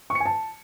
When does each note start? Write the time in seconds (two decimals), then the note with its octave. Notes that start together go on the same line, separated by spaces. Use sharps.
0.10 C#6
0.15 C#7
0.20 G#5
0.26 A5